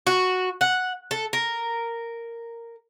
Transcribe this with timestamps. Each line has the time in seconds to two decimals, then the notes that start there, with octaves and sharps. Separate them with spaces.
0.07 F#4
0.61 F#5
1.11 A4
1.33 A#4